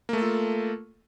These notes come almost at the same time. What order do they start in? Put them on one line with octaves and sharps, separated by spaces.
A#3 A3 A4 F4